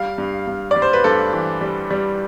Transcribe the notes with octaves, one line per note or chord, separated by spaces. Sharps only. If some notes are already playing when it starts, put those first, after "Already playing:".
Already playing: G3 F5
G2
G2
D5
G3
C5
B4
G2 A4
E3
G3
G3